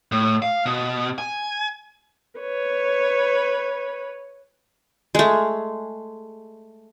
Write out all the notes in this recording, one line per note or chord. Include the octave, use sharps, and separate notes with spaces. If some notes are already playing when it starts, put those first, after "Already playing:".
A2
F5
B2
G#5
B4 C#5
G#3 A3